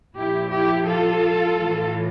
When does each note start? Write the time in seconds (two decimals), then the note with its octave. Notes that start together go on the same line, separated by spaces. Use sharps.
0.16 A#2 F3 E4 G4
0.51 E4 G4
0.88 F4 A4
1.60 A2 E3